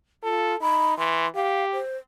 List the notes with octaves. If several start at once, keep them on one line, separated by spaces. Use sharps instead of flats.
F4 A4
D#4 B5
E3 C6
G4 F5
C5